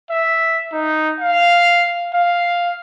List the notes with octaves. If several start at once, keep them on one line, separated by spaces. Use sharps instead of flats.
E5
D#4
F5
F5